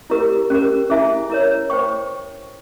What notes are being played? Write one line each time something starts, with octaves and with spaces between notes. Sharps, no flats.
E4 G4 A#4
C#4 G4 A#4
C#4 E4 G#4 E5 G#5
E4 A#4 C#5
C5 G5 C#6